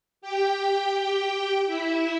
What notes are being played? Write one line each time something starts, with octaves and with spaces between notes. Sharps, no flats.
G4 G5
E4 E5